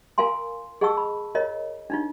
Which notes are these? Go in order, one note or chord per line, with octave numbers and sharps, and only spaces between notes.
F4 A#4 F5 G#5 C6
G#4 D#5 F#5 A5 C#6 E6
B5
F4 A#4 C#5 D#5
D4 D#4 F4